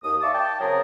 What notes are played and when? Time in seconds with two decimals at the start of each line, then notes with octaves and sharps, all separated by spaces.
0.04 D#2 D#6
0.22 D5 E5 F5 A5 C#6 D6
0.33 G5 A5
0.60 C#3 F#3 C4 G#4 A#4